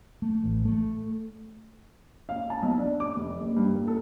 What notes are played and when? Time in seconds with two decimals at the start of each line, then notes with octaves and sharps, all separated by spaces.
0.22 A3
0.44 A1
0.65 A3
2.29 F5
2.50 A5
2.63 B1
2.78 D4
3.00 D6
3.16 F1
3.40 F#1
3.56 G2
3.74 A#3
3.87 A4